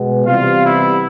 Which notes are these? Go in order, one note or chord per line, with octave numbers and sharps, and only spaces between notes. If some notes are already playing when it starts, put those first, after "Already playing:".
Already playing: B2 G#3 B3
C3 E3 G3 B3 F4 F5
E4 E5